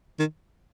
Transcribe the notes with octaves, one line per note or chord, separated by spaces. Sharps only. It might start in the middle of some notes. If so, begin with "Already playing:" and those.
D#3